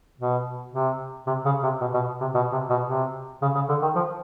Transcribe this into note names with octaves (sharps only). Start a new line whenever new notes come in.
B2
C3
C3
C#3
C3
B2
B2
C3
B2
C3
B2
C3
C#3
C#3
D3
D#3
F3